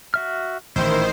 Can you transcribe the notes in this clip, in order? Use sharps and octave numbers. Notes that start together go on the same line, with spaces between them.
F#4 E5 F6
A1 A#2 D#3 E4 C5